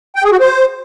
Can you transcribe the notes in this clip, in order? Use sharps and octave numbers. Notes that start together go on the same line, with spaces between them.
G5
G#4
F#4
C5